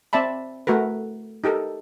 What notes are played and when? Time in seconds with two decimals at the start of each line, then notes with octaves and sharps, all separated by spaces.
0.13 C4 D5 E5 A5 B5
0.67 A3 F#4 A#4 B4
1.44 D#4 G4 A4 A#4